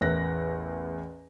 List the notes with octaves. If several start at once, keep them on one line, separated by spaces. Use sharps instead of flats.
A1 E2 A#4 E5 F#6 A#6